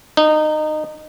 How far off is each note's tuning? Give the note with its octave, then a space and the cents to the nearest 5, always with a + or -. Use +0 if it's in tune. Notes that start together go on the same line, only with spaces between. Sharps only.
D#4 -20